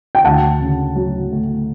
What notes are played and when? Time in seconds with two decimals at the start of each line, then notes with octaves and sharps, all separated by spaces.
0.15 G5
0.24 D2 F#5 A5
0.61 C#3
0.96 F#3
1.31 A3